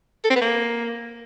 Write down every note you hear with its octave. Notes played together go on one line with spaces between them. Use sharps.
A4
C4
B3
A#3